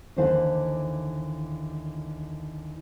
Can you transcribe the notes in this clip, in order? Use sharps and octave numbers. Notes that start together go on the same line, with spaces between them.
D#2 D3 E3 C5 F5 A5